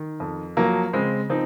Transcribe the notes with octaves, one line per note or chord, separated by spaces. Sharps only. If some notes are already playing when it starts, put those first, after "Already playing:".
Already playing: D#3
F2
F3 F#3 A#3
C#3 G#3 C4
F3 C4 D#4